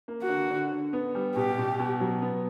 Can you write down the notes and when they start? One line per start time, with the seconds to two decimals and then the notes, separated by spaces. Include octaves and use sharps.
0.08 A#3
0.22 F#4
0.29 D3
0.50 D3
0.72 D3
0.93 B3
1.15 G3
1.36 B2 G4
1.58 B2
1.79 B2
2.00 F#3
2.22 B3